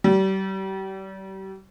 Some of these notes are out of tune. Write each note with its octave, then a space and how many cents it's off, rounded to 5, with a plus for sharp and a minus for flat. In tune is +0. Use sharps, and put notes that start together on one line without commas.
G3 -35